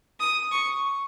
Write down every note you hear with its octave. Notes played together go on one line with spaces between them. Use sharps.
D#6
C#6